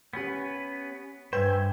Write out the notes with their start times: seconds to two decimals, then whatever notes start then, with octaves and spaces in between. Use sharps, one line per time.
0.13 B3 C#4 G4 B4 B6
1.33 G2 B4 C5 E5 G5 G#5